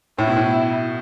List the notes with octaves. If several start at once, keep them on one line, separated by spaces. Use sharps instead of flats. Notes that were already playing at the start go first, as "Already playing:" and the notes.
A2 E4
B2
A2